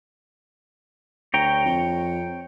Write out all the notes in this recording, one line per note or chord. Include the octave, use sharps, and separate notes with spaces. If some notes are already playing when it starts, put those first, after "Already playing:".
D2 C#5 G5 A#5
F2